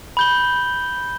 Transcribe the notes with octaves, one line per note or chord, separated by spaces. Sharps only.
B5 G6 G7